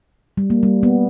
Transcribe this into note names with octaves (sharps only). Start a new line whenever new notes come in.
G3
A#3
G3
B3